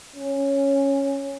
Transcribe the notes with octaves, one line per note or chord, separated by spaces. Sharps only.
C#4